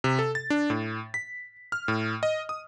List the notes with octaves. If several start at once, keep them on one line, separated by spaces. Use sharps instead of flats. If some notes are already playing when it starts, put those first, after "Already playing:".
C3
A4
A6
D4
A2
B6
F6
A2
D#5
D#6